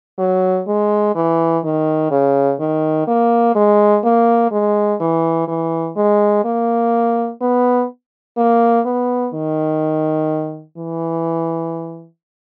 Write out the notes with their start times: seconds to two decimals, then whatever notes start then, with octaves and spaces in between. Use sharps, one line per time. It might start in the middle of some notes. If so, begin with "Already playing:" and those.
0.18 F#3
0.67 G#3
1.15 E3
1.63 D#3
2.11 C#3
2.59 D#3
3.07 A#3
3.55 G#3
4.04 A#3
4.51 G#3
5.00 E3
5.48 E3
5.96 G#3
6.44 A#3
7.41 B3
8.37 A#3
8.85 B3
9.34 D#3
10.77 E3